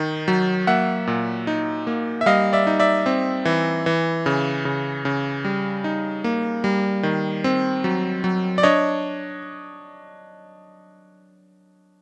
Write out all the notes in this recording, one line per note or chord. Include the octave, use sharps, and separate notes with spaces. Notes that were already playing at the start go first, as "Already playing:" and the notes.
Already playing: D#3 D#4
F#3
A#3 E5 F#5
A#2
D#4
A#3
E5
G3 D#5 F5
D5 E5
D#4
D5 E5
C4
E3
E3
C#3
C#3
C#3
G3
D#4
A#3
G3
D#3
C4
F#3
F#3
D5
D4 C#5 D#5